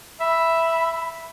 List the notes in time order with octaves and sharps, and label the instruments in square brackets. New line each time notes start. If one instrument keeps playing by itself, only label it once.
[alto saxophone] E5 [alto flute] B5